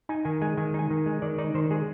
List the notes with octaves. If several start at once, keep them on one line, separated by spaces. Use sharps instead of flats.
D#4 G#5
D#3 G#5
G#3 G#5
D#3 G#5
D#4 G#5
D#3
G#3
D#3 D5
D#4 D5
D#3 C5
G#3 G#4